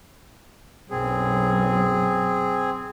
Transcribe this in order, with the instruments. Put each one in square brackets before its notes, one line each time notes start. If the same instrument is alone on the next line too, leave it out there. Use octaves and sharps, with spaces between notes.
[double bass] B1 F#2 [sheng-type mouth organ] C4 G#4